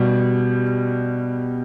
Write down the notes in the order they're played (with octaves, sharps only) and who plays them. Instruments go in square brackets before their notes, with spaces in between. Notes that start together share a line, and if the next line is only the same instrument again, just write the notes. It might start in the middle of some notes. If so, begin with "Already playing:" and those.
Already playing: [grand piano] B2 G3